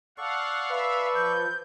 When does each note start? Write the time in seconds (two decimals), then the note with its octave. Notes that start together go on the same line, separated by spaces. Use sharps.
0.18 A4 D5 F5 F#5 C#6
0.70 B4 E5 F5
1.14 F3 G6